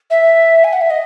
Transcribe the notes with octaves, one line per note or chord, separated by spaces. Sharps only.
E5
G#5
F#5
E5
D#5